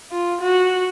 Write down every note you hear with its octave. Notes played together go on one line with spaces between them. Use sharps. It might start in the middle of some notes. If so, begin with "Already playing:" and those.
F4
F#4